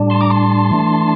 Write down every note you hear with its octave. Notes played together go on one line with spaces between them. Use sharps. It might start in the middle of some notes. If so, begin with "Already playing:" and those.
Already playing: A2 G3 D4
A5 C6
A#5 D6
A5 C6
E3 A3 D4